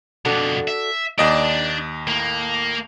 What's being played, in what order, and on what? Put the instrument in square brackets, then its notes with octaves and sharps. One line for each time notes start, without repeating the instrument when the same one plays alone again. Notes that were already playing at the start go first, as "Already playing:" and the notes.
[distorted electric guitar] F2 B2 [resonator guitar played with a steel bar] D4 F#4 A4
[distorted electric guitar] E5
[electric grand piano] D#2 D#5 D7 [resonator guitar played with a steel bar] A#3 D5 [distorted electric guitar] D4
[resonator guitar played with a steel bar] A2 [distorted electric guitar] A#3